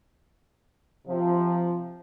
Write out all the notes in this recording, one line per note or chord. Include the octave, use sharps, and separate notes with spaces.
C3 F3